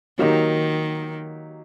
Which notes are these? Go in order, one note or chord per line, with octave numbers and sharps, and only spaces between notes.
D#3 F#3 A#3 D#4 G4